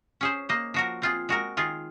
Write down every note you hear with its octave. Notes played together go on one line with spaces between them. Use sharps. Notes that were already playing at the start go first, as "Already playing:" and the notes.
C#4 G#4 C5
A#3 C5 D#5
F3 F#4 A#4
C4 F4 G#4
G#3 F#4 A#4
D#3 F4 G#4